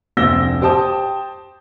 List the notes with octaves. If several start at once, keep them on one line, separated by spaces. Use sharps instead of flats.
F1 D2 C4 E6 A#6 G7
G4 C5 G5 A5 D#6